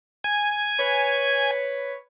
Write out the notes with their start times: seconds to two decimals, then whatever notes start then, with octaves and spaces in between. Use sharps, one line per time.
0.24 G#5
0.79 B4 C#5